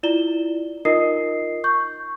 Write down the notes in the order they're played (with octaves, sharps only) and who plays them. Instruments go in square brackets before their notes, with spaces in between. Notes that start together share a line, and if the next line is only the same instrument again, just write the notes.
[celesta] E4 F4 D5 E7 G7
D#4 F4 A#4 D#5 D#6 C7
C#6 G6